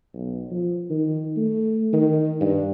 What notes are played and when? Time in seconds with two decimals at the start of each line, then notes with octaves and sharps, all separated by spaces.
0.14 B1
0.52 F3
0.90 D#3
1.37 A3
1.93 D#3
2.41 G2